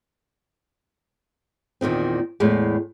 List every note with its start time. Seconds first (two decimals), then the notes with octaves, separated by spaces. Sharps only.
1.81 E2 A#2 D#3 C4
2.40 E2 A2 G#3